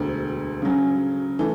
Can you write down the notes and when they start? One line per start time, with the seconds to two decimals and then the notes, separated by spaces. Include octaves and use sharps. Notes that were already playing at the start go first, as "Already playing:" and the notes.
Already playing: E1 D2 D3
0.62 C#3 F#3 C#4
1.39 E3 A3